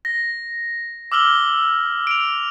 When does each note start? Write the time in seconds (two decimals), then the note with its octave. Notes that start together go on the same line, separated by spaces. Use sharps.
0.05 A#6
1.12 D6 E6 F6 F#7 G7
2.07 D7 F7